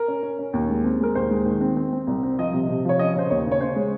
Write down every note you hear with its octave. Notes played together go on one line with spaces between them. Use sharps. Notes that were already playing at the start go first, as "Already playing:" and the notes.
Already playing: A#4
C#4
C#4
C#4
D#2
G#3
C4
G#3 A#4
D#2 C5
G#3
D#3
C4
C4
C4
C2
C4
F3 D#5
C3
C3
F3 C#5
C#4 D#5
C#3 C5
D#2 C#5
C#3
C#5
C#3 C5
G#3